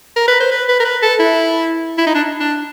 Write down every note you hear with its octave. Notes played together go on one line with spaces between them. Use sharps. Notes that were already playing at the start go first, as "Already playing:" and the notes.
A#4
B4
C5
B4
B4
A#4
B4
A4
E4
E4
D#4
D4
D4